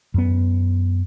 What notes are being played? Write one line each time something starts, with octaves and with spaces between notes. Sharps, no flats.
F#2 B3